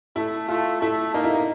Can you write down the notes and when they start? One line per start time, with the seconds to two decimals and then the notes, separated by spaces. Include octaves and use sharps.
0.16 A3 E4
0.49 A3 F4
0.81 A3 E4
1.14 A#3 D#4
1.24 E4
1.35 D#4